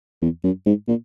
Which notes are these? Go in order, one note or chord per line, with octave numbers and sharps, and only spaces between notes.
E2
F#2
G#2
A#2